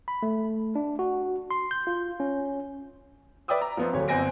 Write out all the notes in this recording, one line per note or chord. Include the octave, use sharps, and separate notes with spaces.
B5
A3
D4
F#4
C6
G6
F4
C#4
B4 D5 E5 G5 D#6 E6
A#5
F3 B3 C4
D1 D3 C#5
G1 C4 G#5 A#6 D7